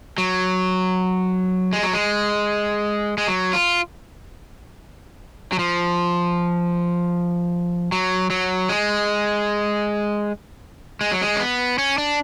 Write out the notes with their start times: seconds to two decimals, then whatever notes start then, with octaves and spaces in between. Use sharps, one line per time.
0.18 F#3
1.73 G#3
1.83 F#3
1.93 G#3
3.18 G#3
3.28 F#3
3.53 F4
5.52 F#3
5.59 F3
7.92 F#3
8.30 F#3
8.69 G#3
11.01 G#3
11.12 F#3
11.21 G#3
11.36 C#4
11.40 B3
11.78 C#4
11.98 D4